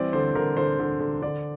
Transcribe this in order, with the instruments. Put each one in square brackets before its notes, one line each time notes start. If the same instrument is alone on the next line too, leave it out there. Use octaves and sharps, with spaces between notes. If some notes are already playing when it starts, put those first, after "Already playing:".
Already playing: [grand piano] E3 G3 C4 D5
D3 C5
D3 A#4
D3 C5
D3
D3
D3 D5